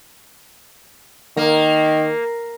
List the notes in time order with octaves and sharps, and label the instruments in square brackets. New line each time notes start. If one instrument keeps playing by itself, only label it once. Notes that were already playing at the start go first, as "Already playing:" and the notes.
[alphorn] D#3 [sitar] A#3